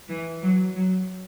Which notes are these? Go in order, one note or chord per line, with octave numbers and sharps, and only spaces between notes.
E3
F#3
F#3